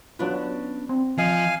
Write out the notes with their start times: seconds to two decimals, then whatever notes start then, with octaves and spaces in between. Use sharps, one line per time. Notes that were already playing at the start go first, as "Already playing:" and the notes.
0.19 F#3 B3 C#4 D4 F4
0.89 C4
1.18 F3 D#5 F5 G#5